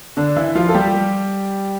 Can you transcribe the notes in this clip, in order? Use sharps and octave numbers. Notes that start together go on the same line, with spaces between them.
D3 D4
E3 E4
F3 F4
A4
G3 G4